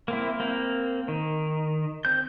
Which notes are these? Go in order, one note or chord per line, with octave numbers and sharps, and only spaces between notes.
A#3 C4 E4
A#3 C4
D#3
C4 G6